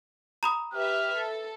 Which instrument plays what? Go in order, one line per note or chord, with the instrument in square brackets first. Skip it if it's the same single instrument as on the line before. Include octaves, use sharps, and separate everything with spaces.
[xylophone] A#5 B5 D#6
[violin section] G4 B4 E5 [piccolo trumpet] F6
[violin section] A4